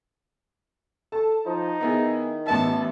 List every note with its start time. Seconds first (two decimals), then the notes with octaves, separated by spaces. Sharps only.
1.12 A4 A5
1.46 F3 D#4
1.81 D#3 B3 E4 G#4
2.47 A1 B3 E5 A5